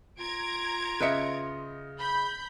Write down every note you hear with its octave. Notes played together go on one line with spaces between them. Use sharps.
F4 A#5 G#6 D7
C#3 B4 D#5 E5 C#7
B5 G6